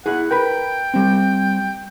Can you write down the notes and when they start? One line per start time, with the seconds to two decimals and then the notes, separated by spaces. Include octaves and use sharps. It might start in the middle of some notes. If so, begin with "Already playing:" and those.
0.06 E4 G#4 F#5
0.31 A#4 B4 G5 B5
0.94 G3 C4